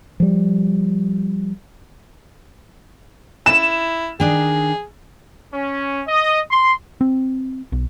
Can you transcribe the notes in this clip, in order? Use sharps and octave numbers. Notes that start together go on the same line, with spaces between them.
F3 G3
E4 E7
D#3 D4 D#4 G#4
C#4
D#5
C6
C4
B1